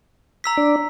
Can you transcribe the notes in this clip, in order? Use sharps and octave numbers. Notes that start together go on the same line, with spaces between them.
A#5 E6 B6
D4 D5